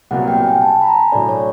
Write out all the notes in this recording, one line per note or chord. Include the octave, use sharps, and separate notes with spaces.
C2 A#2 F#3 B3 F#5
G5
G#5
A5
B5
A#5
G#5
A2 F#3 A3 D4 D5
C#5